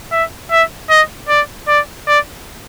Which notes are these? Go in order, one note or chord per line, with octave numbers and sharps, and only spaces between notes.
E5
E5
D#5
D5
D5
D5